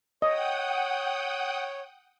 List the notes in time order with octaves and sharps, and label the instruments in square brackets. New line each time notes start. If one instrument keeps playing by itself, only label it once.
[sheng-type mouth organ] C#5 [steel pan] D#5 [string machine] F#5 G5 D#6